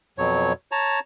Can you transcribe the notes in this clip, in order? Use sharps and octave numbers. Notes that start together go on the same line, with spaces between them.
F2 B2 F#3 C#5
C#5 A5 A#5